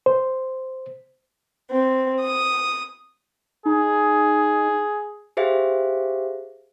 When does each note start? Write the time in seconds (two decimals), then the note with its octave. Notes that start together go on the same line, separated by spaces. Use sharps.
0.06 C5
1.70 C4
2.22 D#6
3.65 D#4 G#4
5.37 G4 G#4 C5 E5 F5